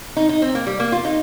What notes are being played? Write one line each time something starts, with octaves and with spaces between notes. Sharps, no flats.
D#4
D#4
C4
A#3
G3
A#3
F4
D#4